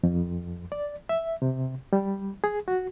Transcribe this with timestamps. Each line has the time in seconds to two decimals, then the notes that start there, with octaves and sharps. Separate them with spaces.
0.03 F2
0.72 D5
1.09 E5
1.42 C3
1.93 G3
2.44 G#4
2.68 F#4